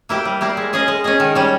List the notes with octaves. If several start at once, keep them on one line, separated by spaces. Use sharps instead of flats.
A#3 E4 G4
G3
A#3 E4 G4
G#3
C#4 G#4 D#5
G#3
C#4 G#4 D#5
D#3
G3 C#4